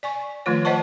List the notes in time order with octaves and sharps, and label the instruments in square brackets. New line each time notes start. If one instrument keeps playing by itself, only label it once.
[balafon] D5 G#5 C#6
D#3 F3 A3 F4 C#5
C5 D5 D#5 F#5 A5 C#6